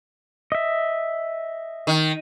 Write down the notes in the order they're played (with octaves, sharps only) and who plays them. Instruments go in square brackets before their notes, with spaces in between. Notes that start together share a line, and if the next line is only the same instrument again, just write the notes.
[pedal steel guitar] D#5 E5
[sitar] D#3